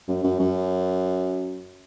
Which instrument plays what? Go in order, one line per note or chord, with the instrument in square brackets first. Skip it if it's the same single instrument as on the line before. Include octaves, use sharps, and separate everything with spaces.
[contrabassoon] F#2
F#2
F#2